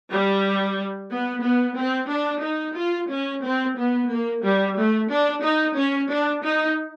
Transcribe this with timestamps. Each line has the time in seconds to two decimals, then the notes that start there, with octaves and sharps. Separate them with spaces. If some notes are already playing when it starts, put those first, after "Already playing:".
0.10 G3
1.10 B3
1.44 B3
1.77 C4
2.09 D4
2.43 D#4
2.76 F4
3.10 C#4
3.43 C4
3.77 B3
4.09 A#3
4.43 G3
4.76 A3
5.10 D4
5.43 D#4
5.77 C#4
6.10 D4
6.43 D#4